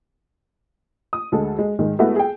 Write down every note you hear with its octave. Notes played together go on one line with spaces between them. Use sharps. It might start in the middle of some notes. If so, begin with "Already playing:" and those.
D#6
D2 G#3 A4
G#3
G#2 D#3 G#3
G#3 A3 B3 E4 F#4
G#4 G5